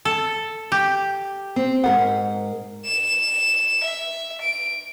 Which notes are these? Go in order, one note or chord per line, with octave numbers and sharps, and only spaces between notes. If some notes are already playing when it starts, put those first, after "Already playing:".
A4
G4
C4
G#2 A#4 F#5
E7
E5
D7